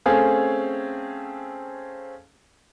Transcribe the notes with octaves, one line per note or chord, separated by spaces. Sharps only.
A3 C4 C#4 G#4 A4 F5